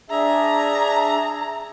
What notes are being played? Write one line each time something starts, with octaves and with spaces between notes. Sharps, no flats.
D4 G#4 E5 A#5